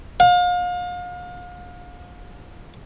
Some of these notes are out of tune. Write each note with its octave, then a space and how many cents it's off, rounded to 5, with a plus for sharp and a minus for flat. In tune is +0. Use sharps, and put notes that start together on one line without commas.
F5 +35